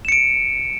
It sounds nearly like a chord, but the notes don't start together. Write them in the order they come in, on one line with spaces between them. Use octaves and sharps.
E7 C#7 D7